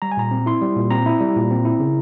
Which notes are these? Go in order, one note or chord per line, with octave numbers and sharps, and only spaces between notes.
G3 A#5
G#5
A#2 A#5
C4
E4 C6
G3
A#2
C4 A#5
E4
G3
A#2
C4
E4
C#3